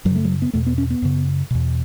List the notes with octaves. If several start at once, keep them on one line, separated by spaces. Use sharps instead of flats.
F#2 F#3
C#3
A3
F#3
B3
E2 B2 A3
B3
C#4
B3
F#2 C#3
E2 B2